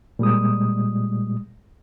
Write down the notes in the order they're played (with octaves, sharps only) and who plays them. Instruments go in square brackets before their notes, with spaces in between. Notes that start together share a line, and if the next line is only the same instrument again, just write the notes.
[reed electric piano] A#2 G3 G#3 D#6